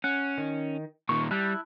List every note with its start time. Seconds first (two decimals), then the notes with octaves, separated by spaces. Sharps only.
0.04 C#4 F#5
0.38 D#3
1.09 A#2 D#3 C#6
1.31 G3 E4 A5 F#6